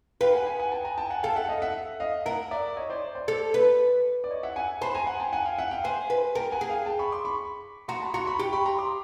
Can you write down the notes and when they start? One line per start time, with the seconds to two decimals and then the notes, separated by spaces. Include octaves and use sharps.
0.21 B4 F5 G5
0.33 F#5 G#5
0.46 F#5 G#5
0.59 F#5 G#5
0.72 G5 A5
0.85 G#5 A#5
0.98 G5 A5
1.10 F#5 G#5
1.23 A4 F5 G5
1.36 E5 F#5
1.49 D#5 F5
1.62 E5 F#5
2.00 D#5 F5
2.26 A#4 E5 F#5
2.51 D5 E5
2.77 C#5 D#5
2.90 C5 D5
3.15 C5 D5
3.28 A4
3.54 B4
4.24 D5
4.31 C#5 D#5
4.43 E5 F#5
4.56 F#5 G#5
4.82 C5 A5 B5
4.95 G#5 A#5
5.07 F#5 G#5
5.20 G5 A5
5.33 F#5 G#5
5.45 F5 G5
5.58 E5 F#5
5.71 F5 G5
5.84 C5 F#5 G#5
6.10 B4
6.35 A#4 G5 A5
6.52 F#5 G#5
6.61 G#4
6.70 F5 G5
6.86 G5 A5
6.99 B5 C#6
7.12 C6 D6
7.25 B5 C#6
7.88 F#4 A#5 C6
8.02 A5 B5
8.14 F#4 A#5 C6
8.27 B5 C#6
8.39 G4
8.53 B5 C#6
8.66 A#5 C6
8.78 C6 D6